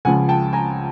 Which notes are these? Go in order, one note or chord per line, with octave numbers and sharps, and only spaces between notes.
C#2 C#3 F3 F#5 G#5
G5 A5
G#5 A#5